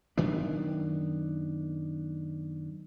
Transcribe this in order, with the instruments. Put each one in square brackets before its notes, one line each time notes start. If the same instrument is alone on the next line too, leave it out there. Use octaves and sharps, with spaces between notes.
[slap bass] F#2 D#3 B3 D4